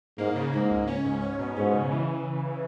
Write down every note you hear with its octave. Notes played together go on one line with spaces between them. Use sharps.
G#2 A#3
C#3
G#2 A#3
C#2
C#4
G#2
C#4
B2
G#2 C#4
C#3
E3